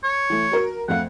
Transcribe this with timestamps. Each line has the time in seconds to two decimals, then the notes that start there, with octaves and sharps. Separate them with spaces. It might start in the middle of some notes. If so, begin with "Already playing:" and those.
0.04 C#5
0.30 E3 A3
0.51 F#4 A#4
0.89 F2 A3 F5 F#5